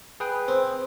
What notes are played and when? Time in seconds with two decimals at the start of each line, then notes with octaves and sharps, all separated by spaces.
0.20 G#4 B4 G5
0.48 C4